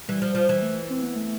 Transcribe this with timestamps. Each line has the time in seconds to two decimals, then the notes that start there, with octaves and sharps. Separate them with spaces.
0.08 E3 G3
0.22 F3
0.35 F3
0.49 E3
0.62 A3
0.90 C4
1.03 B3
1.16 A3